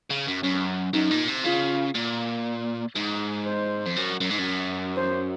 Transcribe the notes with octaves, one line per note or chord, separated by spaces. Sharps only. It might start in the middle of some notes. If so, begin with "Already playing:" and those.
C#3
F#2
F#2 C#4
F#2 D#4
A#2
C3
C#3 F4
A#2
G#2 D#4
C5
F2
F#2
F#2
G#2
F#2
C5